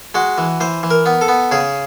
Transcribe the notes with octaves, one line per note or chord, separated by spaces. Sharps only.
G#3 F#4
E3
E3 C5
E3
A#4
B3
A4
B3
C#3 G#4